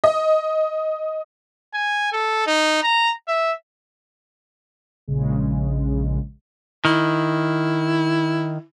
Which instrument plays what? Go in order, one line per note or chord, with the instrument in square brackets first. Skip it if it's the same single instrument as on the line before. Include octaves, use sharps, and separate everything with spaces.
[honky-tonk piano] D#5
[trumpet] G#5
A4
D#4
A#5
E5
[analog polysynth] A#1 C#3 G#3
[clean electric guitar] D#3 [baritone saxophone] E4